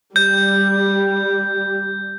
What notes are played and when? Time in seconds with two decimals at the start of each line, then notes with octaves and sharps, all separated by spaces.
0.16 G3 G6